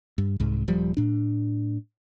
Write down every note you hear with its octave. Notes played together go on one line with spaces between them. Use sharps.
G2
C2 G#2
D#1 F3 G3
A2 D4